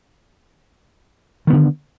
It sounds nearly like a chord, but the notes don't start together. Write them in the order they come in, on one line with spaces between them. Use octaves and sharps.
D#3 B3 D3